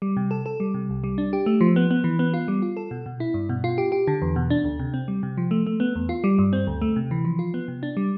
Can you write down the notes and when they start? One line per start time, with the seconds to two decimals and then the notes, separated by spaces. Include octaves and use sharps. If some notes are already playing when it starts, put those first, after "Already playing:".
0.02 G3
0.17 C3
0.31 A4
0.46 A4
0.60 G3
0.74 C3
0.90 C2
1.04 G3
1.18 D4
1.33 G4
1.46 A3
1.61 F3
1.76 B3
1.91 B3
2.04 E3
2.19 B3
2.34 F4
2.48 G3
2.62 F4
2.77 A4
2.91 B2
3.06 B2
3.20 E4
3.34 G2
3.49 B2
3.64 F4
3.78 G4
3.92 G4
4.07 D3
4.22 E2
4.36 B2
4.50 D4
4.64 D2
4.79 C3
4.94 C4
5.08 G3
5.23 C3
5.37 F3
5.51 A3
5.67 A3
5.80 B3
5.95 E2
6.09 F4
6.24 G3
6.39 G2
6.53 C4
6.67 D2
6.81 A3
6.96 C3
7.11 E3
7.25 F3
7.39 F4
7.54 B3
7.68 C3
7.83 D4
7.97 G3